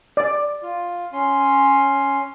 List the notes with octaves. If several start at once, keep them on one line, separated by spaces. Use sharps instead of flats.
D5
F4
C#4 C6